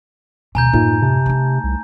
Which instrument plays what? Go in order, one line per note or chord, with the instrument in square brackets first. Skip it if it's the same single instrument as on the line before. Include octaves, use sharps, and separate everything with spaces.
[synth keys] D2 [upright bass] B2 D#3 [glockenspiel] G#5 A#5 G6
[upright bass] F#2 A2 [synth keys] A#3 D#4 F4
[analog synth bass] C3 [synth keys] A5
[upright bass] A3 D#4
[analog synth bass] C2